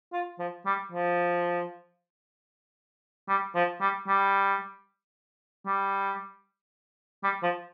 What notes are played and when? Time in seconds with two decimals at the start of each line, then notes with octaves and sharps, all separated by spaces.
0.13 F4
0.39 F3
0.66 G3
0.92 F3
3.28 G3
3.55 F3
3.81 G3
4.08 G3
5.66 G3
7.23 G3
7.43 F3